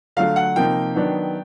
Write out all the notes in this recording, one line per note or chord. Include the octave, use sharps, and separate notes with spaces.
D3 F#3 A3 F5
F#5
C3 F3 A#3 D#4 G5
D#3 F#3 B3 D4